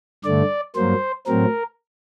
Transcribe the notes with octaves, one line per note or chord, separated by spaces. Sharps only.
G2 D3 A3 D5
G2 F#3 A#3 C5
A2 F#3 C4 A#4